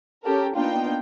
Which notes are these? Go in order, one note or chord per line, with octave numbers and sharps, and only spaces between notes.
C#4 G4 A4 A#4
A#3 B3 D4 D#4 F4 G5